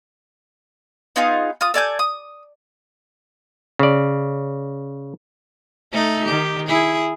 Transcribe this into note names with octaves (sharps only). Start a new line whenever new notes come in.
B3 D#4 F4 G#4
F4 D#6
A4 D5 G#5 G6
D#6
C#3 D5
A3 D#4 A4
D#3 G4
E4 G#4